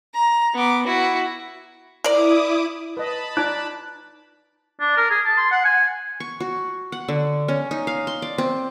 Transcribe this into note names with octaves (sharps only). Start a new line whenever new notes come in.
A#5
B3 D6
E4 F#4
E4 A#4 D5 D6 D#6
B4 D#5 A5 B5
D#4 D5 A#5 D6 F#6
D4
A#4
G#4
A5
C6
F#5
G#5
C#6
F#4
F#5
D3
C#4
D#4
F5
C6
D5
C4